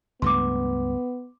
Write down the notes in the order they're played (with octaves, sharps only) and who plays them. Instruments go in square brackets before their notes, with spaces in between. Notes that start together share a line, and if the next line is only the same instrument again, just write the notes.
[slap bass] C#2 G2 A3 [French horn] B3 [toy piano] C6 D6